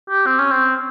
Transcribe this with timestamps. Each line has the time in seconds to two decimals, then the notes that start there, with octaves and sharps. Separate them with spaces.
0.10 G4
0.26 C4
0.39 C#4
0.52 C4